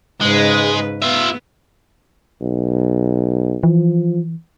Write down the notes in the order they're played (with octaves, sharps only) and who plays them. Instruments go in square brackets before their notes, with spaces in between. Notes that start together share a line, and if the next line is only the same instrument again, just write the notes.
[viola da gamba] G#2 C#3 B4 [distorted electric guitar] G#3
[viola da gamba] B3 [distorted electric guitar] F4 E5
[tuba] B1
[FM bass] E3 [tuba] F3